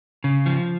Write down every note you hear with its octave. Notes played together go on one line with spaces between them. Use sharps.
C#3
F3